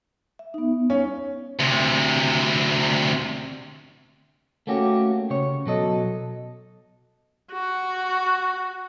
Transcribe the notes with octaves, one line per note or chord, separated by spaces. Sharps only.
E5
B3 D#4
C#4
D2 C3
A3 A#3 C#4 F#4 G4
C#3 C#5
B2 F#3 A4 D#5
F#4